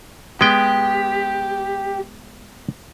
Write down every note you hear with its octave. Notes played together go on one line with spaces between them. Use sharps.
G#3 B3 G4 G5